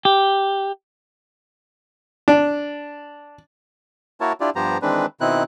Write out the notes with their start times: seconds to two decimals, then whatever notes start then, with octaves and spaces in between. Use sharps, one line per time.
0.05 G4
2.28 D4
4.21 A#3 E4 F#4 A#4 C#5 A5
4.40 D4 E4 F4 G4 D5
4.56 G2 F3 B3 G4 C5 A#5
4.82 D#3 E3 G#3 C4 D4 B4
5.21 B2 D#3 C4 D#4 E4 F#6